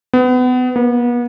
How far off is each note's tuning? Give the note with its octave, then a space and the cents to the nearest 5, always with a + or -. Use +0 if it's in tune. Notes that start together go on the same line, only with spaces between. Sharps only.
B3 +30
B3 -40